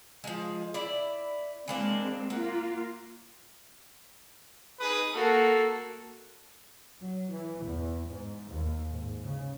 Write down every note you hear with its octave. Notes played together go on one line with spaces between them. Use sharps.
F3 G#3
E4 D5
E3 G#3 A#3 C4 D4
A#3 F4 F#5
D#4 G#4 B4 D#6
A#3 F#4 A4
F#3
E3
E2
G#2
D#2
G#2
C#3